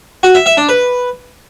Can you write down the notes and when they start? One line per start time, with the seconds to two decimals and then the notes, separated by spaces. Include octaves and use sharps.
0.23 F#4
0.35 E5
0.46 E5
0.57 D4
0.69 B4